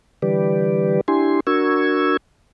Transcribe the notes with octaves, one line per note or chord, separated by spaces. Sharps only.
D3 E3 G3 G4 B4 D5
D4 E4 G4 G#5 C6
D4 F#4 A#4 C#6 E6 G#6